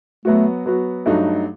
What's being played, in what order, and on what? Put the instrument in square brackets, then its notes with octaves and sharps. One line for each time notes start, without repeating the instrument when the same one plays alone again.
[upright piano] F#3 B3 F#4 [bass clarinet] A3
[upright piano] F#3 B3 F#4
G2 F#3 A3 D#4 F#4